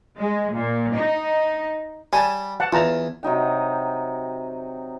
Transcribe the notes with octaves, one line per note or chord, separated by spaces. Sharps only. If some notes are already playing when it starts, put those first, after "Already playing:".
G#3
A#2
D#4
G3 G#5 A5
F#5 A5
E2 F4 A5 A#5
C3 F#3 D#4 G5